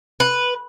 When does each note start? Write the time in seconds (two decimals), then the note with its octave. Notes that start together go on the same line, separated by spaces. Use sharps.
0.20 B4